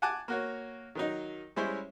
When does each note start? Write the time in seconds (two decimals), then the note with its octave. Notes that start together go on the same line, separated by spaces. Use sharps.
0.02 F#5 G#5 A5 D6 F#6
0.28 A#3 F#4 C#5
0.95 D#3 F#3 D#4
1.56 G3 G#3 C#4 E4 C5 C#5